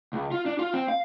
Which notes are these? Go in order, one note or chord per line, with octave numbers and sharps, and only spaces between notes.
C#2
F4
D4
F4
C4
F5